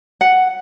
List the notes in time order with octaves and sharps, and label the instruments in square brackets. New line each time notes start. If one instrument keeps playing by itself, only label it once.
[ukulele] F#5